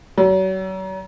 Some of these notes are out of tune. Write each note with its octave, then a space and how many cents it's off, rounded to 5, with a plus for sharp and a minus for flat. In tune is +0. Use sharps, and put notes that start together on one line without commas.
F#3 +40